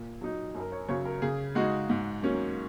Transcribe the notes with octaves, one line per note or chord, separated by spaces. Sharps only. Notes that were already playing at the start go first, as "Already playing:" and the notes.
Already playing: A#2
F#3 D#4
F#2
A#4
C#5
C#3 F#3 C#5
A#4
C#3 G#4
G#3 D#4 F#4
G#2
F#3 A#3 C#4